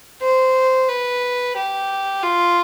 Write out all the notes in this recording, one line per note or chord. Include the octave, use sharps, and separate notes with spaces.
C5
B4
G4
F4